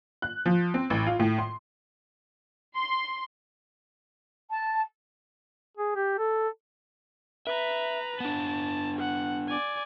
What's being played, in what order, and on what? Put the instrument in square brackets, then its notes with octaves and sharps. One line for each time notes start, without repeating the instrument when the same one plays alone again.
[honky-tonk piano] F#6
F3
C4
A1
F4
A2
C6
[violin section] C6
[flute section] A5
[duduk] G#4
G4
A4
[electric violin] B4 A#5 [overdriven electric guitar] E5
[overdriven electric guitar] B3 D4 [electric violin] A5
[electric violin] F#5
D5 G#5